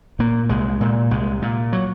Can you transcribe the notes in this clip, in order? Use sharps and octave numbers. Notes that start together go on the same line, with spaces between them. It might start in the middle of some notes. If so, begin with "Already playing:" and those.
A#2 A#3
C2 G#3
A#2
C2 G#3
A#2
F#3